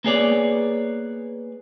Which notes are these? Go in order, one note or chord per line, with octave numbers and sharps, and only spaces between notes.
A#3 B3 G#4 C#5 D5